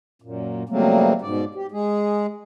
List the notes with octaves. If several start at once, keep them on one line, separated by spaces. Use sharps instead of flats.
F#2 A#2
C#3 F#3 G3 A3 A#3 C4
G#2 B2 D5
G4
G#3 G#4